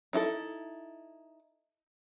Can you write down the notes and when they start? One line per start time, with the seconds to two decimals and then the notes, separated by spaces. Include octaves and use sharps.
0.13 D#4 E4 F#4 A4